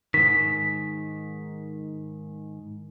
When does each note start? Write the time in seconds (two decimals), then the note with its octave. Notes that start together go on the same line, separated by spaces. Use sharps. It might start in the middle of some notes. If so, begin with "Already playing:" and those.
0.14 G#2 D#3 B6